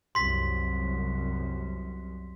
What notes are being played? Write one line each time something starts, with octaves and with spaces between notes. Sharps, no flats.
C2 F#2 C6 B6